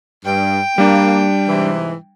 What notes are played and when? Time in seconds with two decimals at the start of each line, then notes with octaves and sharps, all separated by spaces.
0.25 G2 G5
0.78 G3 A#3 D4
1.48 G#2 C3 E3